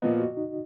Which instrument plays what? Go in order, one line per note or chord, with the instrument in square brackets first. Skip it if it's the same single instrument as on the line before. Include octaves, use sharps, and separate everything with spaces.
[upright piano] A#2 F3 B3 [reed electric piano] D#5
[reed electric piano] F#4
D#4